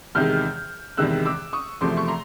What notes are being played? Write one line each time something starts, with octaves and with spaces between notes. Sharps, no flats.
E2 C3 D#3 G#3 F6 G6
E2 C3 D#3 G#3 E6 F#6
D6 E6
C#6 D#6
E2 C3 F3 A3 C6 D6
C#6
A#5 C6